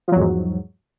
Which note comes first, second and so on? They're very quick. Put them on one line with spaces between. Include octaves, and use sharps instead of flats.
F3 F#3 E2 G#2